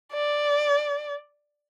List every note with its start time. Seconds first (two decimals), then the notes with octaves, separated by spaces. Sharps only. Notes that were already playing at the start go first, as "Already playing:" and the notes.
0.13 D5